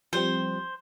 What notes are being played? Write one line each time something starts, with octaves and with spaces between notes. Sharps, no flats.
F3 G3 C4 C5